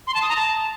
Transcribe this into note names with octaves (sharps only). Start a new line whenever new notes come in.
C6
A5
D#6
A#5
A5